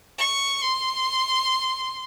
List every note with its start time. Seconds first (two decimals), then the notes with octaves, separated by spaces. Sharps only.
0.18 C#6
0.62 C6